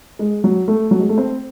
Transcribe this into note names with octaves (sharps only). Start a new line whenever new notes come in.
G#3
F#3
A3
F#3
G#3
A3
C4